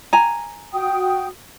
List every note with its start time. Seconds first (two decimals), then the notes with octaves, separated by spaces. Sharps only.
0.13 G#5 A#5
0.73 F#4 G5 D#6